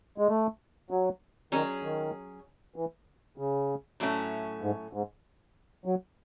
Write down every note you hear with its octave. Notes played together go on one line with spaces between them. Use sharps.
G#3
A3
F#3
D#3 F#3 C#4 G#4
D#3
E3
C#3
A2 F#3 A3 C#4
G#2
G#2
F#3